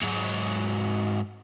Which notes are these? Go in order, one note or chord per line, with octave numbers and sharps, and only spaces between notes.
G#2 F#3